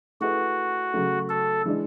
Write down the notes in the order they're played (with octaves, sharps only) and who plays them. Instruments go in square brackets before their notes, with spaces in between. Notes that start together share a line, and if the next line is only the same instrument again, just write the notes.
[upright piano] A3 E4 G#4 B4 [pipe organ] F#4
[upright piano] C#3 F#3 A3
[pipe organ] A4
[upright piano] E3 G#3 D4